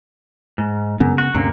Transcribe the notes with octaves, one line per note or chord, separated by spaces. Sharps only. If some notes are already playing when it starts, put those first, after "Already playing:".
G#2
F#2 C#3 B3 C#4
F#4
D2 G2 C3 A#3 C#4